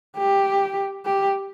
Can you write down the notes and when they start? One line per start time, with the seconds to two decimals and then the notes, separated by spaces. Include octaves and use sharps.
0.17 G4
1.05 G4